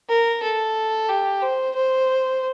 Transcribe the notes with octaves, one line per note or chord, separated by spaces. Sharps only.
A#4
A4
G4
C5
C5